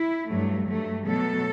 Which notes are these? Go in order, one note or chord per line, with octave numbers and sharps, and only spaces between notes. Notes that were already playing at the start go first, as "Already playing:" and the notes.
Already playing: E4
G2 F#3 A3
G2 F#3 A3
B2 F#3 A3 A4